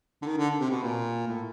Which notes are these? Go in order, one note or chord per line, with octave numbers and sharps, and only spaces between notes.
D3
D#3
D3
C3
B2
A#2
A2